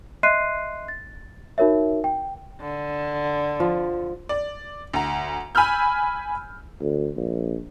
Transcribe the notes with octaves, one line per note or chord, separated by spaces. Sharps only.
D#5 E5 C6 F#6 C7 D#7
A6
D#4 F#4 A#4 C#5 E5
G5
D3
F3
D5
D2 A#5
G#5 B5 E6 F6 G6
D2
A#1